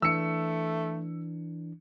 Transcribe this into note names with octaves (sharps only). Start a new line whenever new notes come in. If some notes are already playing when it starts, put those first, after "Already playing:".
E3 A3 D4 E6 C#7